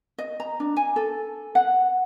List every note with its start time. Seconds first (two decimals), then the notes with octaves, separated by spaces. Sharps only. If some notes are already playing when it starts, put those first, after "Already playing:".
0.18 D#5
0.40 A#5
0.60 D4
0.76 G#5
0.96 A4
1.55 F#5